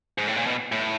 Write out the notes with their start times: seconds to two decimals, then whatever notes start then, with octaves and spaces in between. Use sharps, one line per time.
0.18 G#2
0.27 A2
0.36 A#2
0.46 B2
0.72 A2